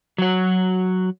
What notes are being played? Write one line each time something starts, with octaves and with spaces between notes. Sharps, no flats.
F#3 F#4